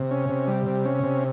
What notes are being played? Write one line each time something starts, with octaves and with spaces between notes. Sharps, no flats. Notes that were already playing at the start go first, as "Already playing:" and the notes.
Already playing: C3
C#4
C3
G3
C3
C#4
C3